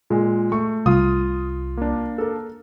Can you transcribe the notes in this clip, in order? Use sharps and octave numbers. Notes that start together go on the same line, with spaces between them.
A#2 G#3
A3 C#6
C2 F4 D#6
A#3 D4
A4 A#4